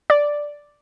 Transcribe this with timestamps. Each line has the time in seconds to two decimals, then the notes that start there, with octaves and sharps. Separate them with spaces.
0.10 D5